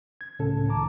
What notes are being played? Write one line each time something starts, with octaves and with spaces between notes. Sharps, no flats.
G#6
C#2 A2 C#3 C#4 A4
C#2 G#2 D#3 A5 A#5 D6